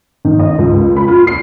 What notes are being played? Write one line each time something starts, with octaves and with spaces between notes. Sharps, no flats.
D#3
D#5
C#2
B5
F4
C7